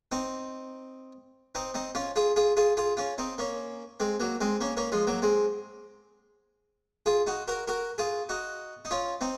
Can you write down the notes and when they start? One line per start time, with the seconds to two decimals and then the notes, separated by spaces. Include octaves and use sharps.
0.12 C4 D#4
1.55 C4 D#4
1.74 C4 D#4
1.95 C#4 F4
2.16 F4 G#4
2.36 F4 G#4
2.57 F4 G#4
2.77 F4 G#4
2.97 C#4 F4
3.18 C4 D#4
3.38 A#3 C#4
4.00 G#3 C4
4.20 F#3 A#3
4.41 G#3 C4
4.61 A#3 C#4
4.77 A#3 C#4
4.92 F3 G#3
5.07 F#3 A#3
5.22 G#3 C4
7.06 F4 G#4
7.27 D#4 F#4
7.48 F#4 A#4
7.68 F#4 A#4
7.98 F4 G#4
8.29 D#4 F#4
8.85 D#4
8.91 C#4 F4
9.21 C4 D#4